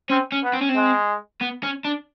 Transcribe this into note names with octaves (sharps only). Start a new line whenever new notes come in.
C4 C#4
C#4
B3
C4
C#4
C4
G#3
B3
C#4
D4